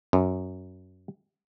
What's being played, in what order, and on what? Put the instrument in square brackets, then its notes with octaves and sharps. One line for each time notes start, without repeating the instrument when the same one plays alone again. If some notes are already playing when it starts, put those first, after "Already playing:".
[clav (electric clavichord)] F#2